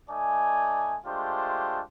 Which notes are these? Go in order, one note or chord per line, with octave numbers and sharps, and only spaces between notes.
A3 D#4 D5 G#5
G#3 A3 D4 F4 G4 C5